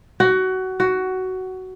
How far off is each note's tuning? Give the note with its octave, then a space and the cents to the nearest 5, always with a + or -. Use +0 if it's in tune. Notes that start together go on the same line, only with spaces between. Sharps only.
F#4 +20
F#4 +15